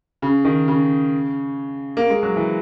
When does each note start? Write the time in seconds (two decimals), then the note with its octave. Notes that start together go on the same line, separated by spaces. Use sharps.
0.22 C#3
0.45 D#3
0.68 C#3
1.97 A#3
2.10 G#3
2.23 F#3
2.36 E3